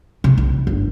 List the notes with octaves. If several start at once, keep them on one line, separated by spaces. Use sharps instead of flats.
C3
B1
G1